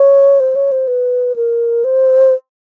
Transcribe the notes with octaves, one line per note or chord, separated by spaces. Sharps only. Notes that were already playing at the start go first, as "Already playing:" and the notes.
Already playing: C#5
C5
C#5
C5
B4
A#4
C5